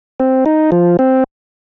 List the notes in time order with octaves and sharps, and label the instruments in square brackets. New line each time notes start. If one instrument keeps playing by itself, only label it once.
[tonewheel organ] C4
D#4
F3
C4